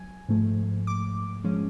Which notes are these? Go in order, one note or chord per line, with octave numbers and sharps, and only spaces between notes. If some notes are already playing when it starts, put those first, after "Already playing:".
Already playing: F#3 G#5
G#2 F3 A3
D6
F3 G#3 C#4